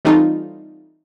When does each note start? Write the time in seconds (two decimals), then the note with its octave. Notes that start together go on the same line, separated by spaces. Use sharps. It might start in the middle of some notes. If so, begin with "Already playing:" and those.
0.05 E3 G3 A3 C4 D#4 F4